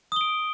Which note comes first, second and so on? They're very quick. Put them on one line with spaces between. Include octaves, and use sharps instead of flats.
D#6 G7 D7